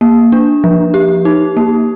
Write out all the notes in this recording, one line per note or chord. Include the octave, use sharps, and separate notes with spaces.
A#3
D4
F3
G4
D#4
A#3